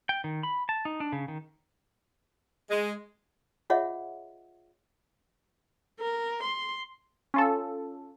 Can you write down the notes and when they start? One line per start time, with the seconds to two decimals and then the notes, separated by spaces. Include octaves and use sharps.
0.09 G5
0.24 D#3
0.43 B5
0.69 A5
0.85 D#4
1.00 D4
1.12 C#3
1.28 D#3
2.71 G#3
3.70 F4 G#4 C#5 D#5 E5 F#5
6.01 A#4
6.43 C6
7.34 C#4 F4 A4